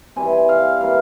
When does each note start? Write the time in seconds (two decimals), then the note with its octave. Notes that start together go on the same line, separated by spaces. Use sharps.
0.16 E3 G3 C4 G#5
0.33 G#5
0.49 F5
0.81 E3 G3 A#3 F5